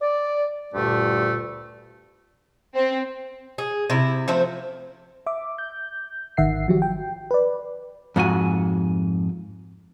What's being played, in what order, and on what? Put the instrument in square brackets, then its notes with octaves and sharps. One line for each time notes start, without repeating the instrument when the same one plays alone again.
[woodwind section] D5
D2 G2 A#2 A3
[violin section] C4
[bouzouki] G#4
C3 E4
F3 A3 C4 C5
[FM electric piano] E5 D6
G6
G#1 D#3 E5 F#5 C7
F3 F#3 F#4 G4
G5
B4 D5
[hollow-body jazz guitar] F2 G#2 F#4 G#5